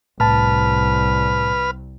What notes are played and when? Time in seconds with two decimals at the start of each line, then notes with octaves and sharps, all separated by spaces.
0.20 C2 A2 B4 A5 F6